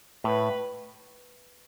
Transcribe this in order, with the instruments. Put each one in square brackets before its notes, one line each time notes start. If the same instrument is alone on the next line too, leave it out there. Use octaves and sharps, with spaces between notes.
[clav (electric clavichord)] A2 [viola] B4